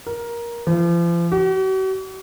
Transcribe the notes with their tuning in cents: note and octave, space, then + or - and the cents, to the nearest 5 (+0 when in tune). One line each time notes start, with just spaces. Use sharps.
A#4 +15
F3 -40
F#4 +45